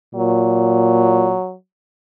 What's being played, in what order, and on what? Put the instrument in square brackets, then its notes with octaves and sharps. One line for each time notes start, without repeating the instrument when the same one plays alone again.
[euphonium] A#2 [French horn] F#3